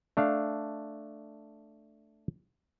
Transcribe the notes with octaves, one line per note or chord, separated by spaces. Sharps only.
A3 D4 F5